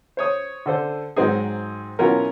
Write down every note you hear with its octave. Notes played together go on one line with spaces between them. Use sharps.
C5 C#5 D#6
D3 A4 C5
G#2 F#3 C4 D#4 G#4
B2 E3 F#3 C#4 F4 A#4